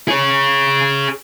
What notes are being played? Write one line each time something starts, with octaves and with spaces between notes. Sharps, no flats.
G#4 C#5